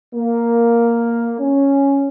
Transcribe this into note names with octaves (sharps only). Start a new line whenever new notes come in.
A#3
C#4